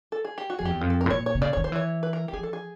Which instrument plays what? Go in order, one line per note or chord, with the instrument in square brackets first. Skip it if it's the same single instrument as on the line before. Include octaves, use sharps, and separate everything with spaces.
[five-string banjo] A4
G#4
G4
F#4
[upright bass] F2 [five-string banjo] G#4
[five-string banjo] G4
[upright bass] E2
F2
[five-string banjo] A4
A#4
[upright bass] A2
[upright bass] A#2 [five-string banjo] C#5
[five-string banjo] C#5
[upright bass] C3
[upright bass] C#3 [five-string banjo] D5
[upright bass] D#3 [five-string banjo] C#5
[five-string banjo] C5
[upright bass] E3 [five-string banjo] C#5
[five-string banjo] B4
A#4
G4
[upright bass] F3 [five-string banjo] G#4
[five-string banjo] A4
G#4